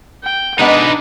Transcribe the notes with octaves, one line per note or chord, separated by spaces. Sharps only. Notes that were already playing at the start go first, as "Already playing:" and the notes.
G5
G#3 B3 D4 D#4 B4 D#5